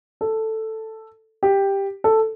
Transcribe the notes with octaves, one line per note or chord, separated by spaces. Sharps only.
A4
G4
A4